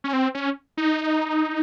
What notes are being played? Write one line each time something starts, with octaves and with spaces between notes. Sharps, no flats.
C#4
C4
C#4
D#4